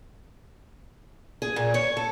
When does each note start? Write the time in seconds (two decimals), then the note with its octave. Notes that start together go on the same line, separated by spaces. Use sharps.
1.42 G#4
1.56 A#2
1.74 C#5
1.97 A4